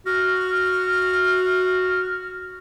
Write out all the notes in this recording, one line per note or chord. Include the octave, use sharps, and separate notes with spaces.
F#4 F6